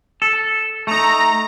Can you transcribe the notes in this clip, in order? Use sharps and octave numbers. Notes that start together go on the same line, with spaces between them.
A4
A3 D#4 A#5